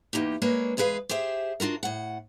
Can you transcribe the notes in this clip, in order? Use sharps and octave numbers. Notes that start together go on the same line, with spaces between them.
E2 A#3 D#4 G4
G#3 A#3 D4 B4 C#5
E2 G#3 G#4 B4 F5
G4 G#4 C5 E5
D4 F4 F#4 A#4
A2 F#5